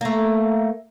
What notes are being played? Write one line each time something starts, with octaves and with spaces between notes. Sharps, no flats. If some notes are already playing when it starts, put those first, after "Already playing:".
A3 A#3